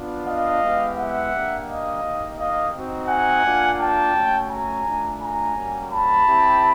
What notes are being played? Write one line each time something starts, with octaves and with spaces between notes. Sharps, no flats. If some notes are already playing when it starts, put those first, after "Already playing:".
Already playing: B3 D4 F4
D#5 F5
G#3 B3 E4 G4
E5 F#5
A#3 D4 G4
D#5 F5
A#3 D#4 G4
D#5 F5
C4 D#4 F#4
F#5 G#5
A#3 D4 F4
G5 A5
A3 C#4 F#4
G#5 A#5
A3 D4 F4
G#5 A#5
G3 A#3 C#4 F#4
A5 B5
C4 E4 G4